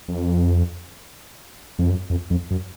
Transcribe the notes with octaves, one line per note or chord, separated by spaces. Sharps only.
F2
F2
F#2
F2
F2
F#2